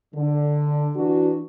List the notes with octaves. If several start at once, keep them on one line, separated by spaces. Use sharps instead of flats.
D3
E3 D4 F#4